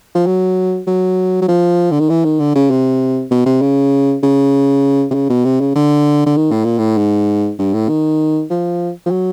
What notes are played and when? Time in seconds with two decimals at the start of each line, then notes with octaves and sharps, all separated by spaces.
0.15 F3
0.26 F#3
0.87 F#3
1.42 F#3
1.48 F3
1.91 D3
2.00 D#3
2.09 E3
2.25 D#3
2.40 D3
2.55 C#3
2.70 C3
3.31 B2
3.46 C3
3.62 C#3
4.23 C#3
5.11 C3
5.14 C#3
5.30 B2
5.45 C3
5.60 C#3
5.76 D3
6.26 D3
6.37 D#3
6.52 A2
6.64 A#2
6.78 A2
6.98 G#2
7.59 G2
7.74 A2
7.89 D#3
8.50 F3
9.06 F3
9.11 F#3